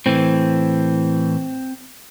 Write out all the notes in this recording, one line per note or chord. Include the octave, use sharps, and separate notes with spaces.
A2 E3 C4